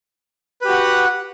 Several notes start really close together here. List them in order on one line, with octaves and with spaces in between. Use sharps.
B4 G4 F#4 F#5